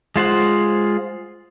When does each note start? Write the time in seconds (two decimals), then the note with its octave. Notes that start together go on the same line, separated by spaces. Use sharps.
0.16 G#3 F4 C5 F#5